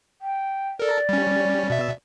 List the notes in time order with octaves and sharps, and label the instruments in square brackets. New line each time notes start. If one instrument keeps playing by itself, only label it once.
[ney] G5
[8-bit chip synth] A4 A#4 [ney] D5
[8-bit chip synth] G3 C#4
B2 E5